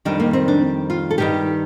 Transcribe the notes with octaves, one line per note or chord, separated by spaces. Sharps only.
F2 D#3 G3 D4
A#3
C4
D4
F4
A4
G2 D#3 G3 G4